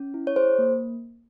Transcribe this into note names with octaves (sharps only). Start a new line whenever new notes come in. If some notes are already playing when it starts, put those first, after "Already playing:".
Already playing: C#4
E4
C#5
G#4 C5
A#3